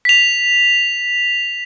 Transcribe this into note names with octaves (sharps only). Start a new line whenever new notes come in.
B6 F7